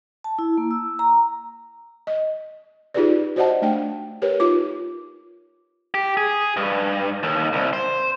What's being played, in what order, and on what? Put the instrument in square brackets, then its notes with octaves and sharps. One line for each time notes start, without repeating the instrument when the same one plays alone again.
[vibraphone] A5
E4
A#3
E6
A#5
[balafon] D#5
D#4 F4 G4 G#4 B4 D5
F#4 C5 D5 D#5 F#5 A5
A3 D4 G5
G4 A#4 B4 C#5
D#4 F4 D6
[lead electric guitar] G4
G#4
G2
D#2
C2
C5